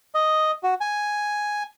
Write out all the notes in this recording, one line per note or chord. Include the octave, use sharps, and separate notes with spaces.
D#5
F#4
G#5